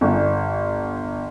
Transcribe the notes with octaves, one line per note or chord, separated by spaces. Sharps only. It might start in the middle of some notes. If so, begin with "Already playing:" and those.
G1